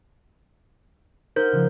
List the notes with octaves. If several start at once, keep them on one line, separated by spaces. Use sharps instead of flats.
D#4 A#4 C5 F#5 G6
C#3 F3